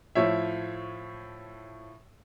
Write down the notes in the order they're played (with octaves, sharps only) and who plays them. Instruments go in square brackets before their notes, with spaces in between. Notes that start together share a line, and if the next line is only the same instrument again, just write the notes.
[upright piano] A2 F3 C#5 E5